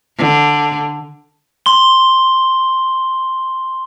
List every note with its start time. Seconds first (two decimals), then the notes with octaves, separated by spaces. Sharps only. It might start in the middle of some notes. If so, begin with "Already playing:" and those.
0.18 D3
1.66 C6 G7